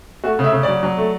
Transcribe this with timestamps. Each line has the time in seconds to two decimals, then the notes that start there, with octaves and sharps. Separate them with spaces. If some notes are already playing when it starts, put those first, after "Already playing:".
0.24 A3 F#4
0.39 C#3
0.44 E5
0.53 C#3
0.63 F#3 D5
0.83 F#3
0.97 A3